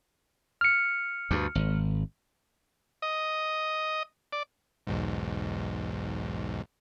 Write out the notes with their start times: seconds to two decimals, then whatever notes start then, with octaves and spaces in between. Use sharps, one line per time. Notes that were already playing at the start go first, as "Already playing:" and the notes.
0.61 F6 C#7
1.31 D2 G2
1.55 G#1
3.02 D#5
4.33 D5
4.87 B1 E2 G#2